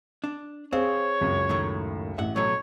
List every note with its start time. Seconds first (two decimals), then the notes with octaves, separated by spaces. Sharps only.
0.24 D4
0.73 C4 G#4 C5 C#5 F5
1.21 C#2 F#2
1.49 A2 D#3 A3
2.18 A1 E5 F#5
2.36 B2 F#3 A3 C#5